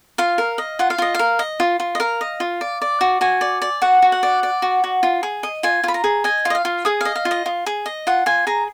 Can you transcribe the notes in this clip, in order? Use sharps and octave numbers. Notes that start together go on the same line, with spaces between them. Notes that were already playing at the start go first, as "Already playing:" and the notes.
F4 F5
A#4
D#5
F4 F#5
F5
F4 D#5
A#4 F5
D#5
F4
F4
D#5
A#4 F5
D#5
F4
D5
D5
F#4
F#4 G#5
D5
D5
F#4 F#5
F#4
F#5
D5
D5
F#4
F#4
F4
G#4
D#5
F4 G#5
F4 B5
A#5
G#4
D#5 G#5
F4
D#5
F5
F4
G#4 D#6
D#5 F5
F5
F4
D#5
F4
G#4
D#5
F4 F#5
F4 G#5
G#4 A#5